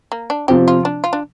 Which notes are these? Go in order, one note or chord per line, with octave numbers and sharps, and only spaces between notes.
A#3
D4
C3 F3 C4 G4
F4
D4
F4
D4